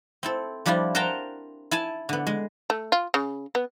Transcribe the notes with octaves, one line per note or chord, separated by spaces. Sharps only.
C4 E4 A4
F3 G3 D4 E4 F4
A#4 C5 F#5 G5 A5 A#5
E4 G#5 A5
D3 B3
G#3
A3
F4
C#3
B3